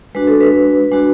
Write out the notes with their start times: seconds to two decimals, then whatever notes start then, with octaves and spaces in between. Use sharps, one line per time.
0.15 G#3 D4 F#4 B4
0.28 A4
0.41 B4
0.92 G#3 D4 F#4